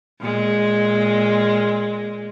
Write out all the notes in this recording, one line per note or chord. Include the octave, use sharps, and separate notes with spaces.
A#2 G#3